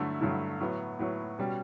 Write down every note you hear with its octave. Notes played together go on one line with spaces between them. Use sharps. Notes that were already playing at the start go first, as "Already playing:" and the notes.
Already playing: G2 D3 F#3 A3 E4
G2 D3 F#3 A3 E4
A2 F#3 B3
A2 F#3 B3
B2 G3 C#4